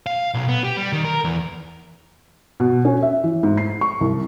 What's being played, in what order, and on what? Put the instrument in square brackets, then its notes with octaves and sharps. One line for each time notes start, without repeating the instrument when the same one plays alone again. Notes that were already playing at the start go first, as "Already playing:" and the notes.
[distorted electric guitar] F5
B1
B3
G4
G3
D#3
A#4
E2
[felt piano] B2
C#4
E5
E3
G#2
C7
C#6
C2